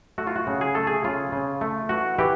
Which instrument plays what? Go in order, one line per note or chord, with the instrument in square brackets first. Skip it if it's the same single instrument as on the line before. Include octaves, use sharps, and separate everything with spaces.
[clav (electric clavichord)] A3 F#4
F4
F#4
C#3
G#4
A3 A4
G#4
C#3 F4
C#3
A3
E3 F#4
E3 G4